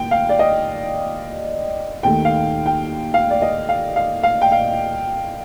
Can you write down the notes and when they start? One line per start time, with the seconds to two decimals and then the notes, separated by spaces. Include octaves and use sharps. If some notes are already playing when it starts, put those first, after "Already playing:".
Already playing: D#2 G5
0.11 F5
0.29 D5
0.39 D#5
2.03 D#2 D#3 A3 G5
2.25 F5
2.66 G5
3.14 F5
3.30 D5
3.42 D#5
3.69 F5
3.96 F5
4.23 F5
4.42 G5
4.52 F5